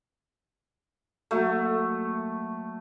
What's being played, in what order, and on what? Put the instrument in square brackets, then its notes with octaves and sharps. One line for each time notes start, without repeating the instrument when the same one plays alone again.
[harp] F#3 A#3 F#4 [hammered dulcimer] A3